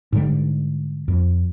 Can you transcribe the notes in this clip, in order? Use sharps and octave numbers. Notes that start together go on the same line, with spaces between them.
G#2 D3 G3
F2